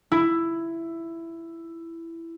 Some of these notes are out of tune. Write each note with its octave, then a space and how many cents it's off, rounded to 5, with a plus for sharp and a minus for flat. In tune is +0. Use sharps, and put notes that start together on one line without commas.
E4 +10